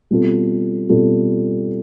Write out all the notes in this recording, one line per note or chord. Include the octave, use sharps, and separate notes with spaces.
B2 G3 C4 F4 A4
B2 G3 C4 F4 A4